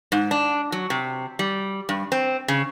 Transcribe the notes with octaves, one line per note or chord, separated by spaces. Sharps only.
G#2
D4
F#3
C3
G3
G2
C4
C#3